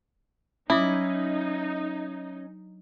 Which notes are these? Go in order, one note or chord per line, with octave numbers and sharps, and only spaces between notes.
F#3 C#4 D#4 E4 D6 D#6